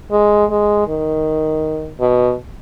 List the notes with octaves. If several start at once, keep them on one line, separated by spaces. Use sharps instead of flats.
G#3
G#3
D#3
B2